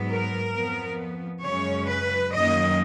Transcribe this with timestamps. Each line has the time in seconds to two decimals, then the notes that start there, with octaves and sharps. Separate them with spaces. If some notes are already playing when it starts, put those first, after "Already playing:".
Already playing: G#2 F#3 B3
0.09 A#4
0.54 F2 F3 B3
1.43 F#2 C#3 G#3 C#4 C#5
1.88 B4
2.33 F#2 D#3 A#3 D#5